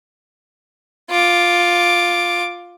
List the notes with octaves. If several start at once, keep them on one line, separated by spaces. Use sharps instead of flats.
F4 D6